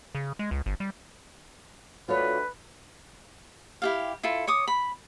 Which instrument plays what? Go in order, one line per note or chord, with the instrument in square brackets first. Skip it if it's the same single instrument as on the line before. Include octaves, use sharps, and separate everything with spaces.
[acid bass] C#3
G#3
C#2
G1
G3
[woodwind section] D2 [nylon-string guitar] F4 C#5 [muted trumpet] B4
[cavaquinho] E4 G4 F5
E4 F4 A4
C#5 D6 D#6
B5